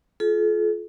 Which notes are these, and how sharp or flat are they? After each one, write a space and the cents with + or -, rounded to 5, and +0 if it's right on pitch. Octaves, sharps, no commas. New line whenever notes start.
F4 +0 A4 -45